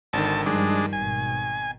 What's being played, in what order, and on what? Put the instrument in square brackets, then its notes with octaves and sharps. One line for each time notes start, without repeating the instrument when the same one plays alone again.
[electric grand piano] G#1 D3 D#3 [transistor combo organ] A5
[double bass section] G2 F3 G3 [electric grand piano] D#3 [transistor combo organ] G#3 D4
[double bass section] G#1 B2 [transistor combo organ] G#5